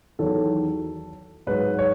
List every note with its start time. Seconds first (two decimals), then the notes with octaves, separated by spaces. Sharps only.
0.19 E2 D#3 F#3 A4
1.47 G#2 F#3 B4
1.79 C#5